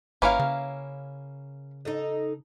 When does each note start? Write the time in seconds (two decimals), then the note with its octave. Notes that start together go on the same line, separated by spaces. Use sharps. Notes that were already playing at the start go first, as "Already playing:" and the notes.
0.22 G#1 A#3 C#4 E4 B4 C#5 F5
0.39 C#3
1.85 D#4 A4 D#5